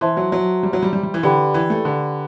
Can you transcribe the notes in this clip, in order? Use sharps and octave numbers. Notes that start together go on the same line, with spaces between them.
E3 C5 E5 A5 C6
F#3
F#3
G3
F#3
G3
G3
G3
E3
D3 G4 B4 D5 G5 B5
E3
A3
D3